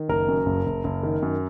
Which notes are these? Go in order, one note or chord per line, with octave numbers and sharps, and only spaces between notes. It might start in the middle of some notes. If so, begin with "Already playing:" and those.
Already playing: D#3
F#1 A#4
F#2
F#1
F#1
F#1
D#3
F#2